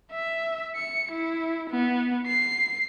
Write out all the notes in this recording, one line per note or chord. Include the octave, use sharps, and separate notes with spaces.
E5
C#7
E4
B3
C7